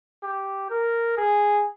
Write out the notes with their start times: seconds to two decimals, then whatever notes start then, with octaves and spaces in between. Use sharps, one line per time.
0.23 G4
0.70 A#4
1.18 G#4